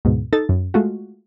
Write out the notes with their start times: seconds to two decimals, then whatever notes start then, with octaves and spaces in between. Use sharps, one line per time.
0.05 D2 G#2 B2
0.33 D#4 A4 A6
0.49 F#2
0.74 G#3 A3 F4 F#4